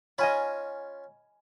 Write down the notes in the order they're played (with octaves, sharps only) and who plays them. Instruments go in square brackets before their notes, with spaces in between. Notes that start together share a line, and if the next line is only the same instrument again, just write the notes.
[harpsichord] C#4 F4 [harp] D#5 G#5 B5